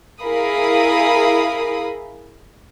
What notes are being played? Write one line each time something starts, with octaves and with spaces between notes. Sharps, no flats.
E4 G#4 A#4 F5 B5 D#6